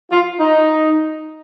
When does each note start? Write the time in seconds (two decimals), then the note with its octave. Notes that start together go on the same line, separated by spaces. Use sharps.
0.12 F4
0.40 D#4